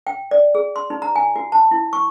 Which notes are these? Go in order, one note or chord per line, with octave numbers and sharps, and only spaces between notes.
G5
D5
G#4
C6
D#4
A#5
G#5
F#4
A5
E4
C#6